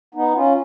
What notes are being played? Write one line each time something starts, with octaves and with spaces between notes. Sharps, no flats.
B3 D#4
C#4 F4